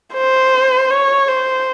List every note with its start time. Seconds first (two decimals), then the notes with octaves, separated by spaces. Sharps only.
0.14 C5
0.90 C#5
1.28 C5